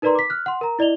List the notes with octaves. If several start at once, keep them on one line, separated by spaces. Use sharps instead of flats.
D#4 A#4 B4 D5 A#5 C6
D6 B6
F6 F#6
F#5 C6
A#4 A#5
E4 D5 D#5 F7 G7